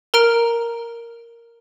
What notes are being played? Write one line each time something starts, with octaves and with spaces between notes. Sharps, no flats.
A#4 A#5 F6 D7